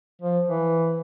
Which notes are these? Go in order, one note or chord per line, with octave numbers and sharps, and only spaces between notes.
F3
E3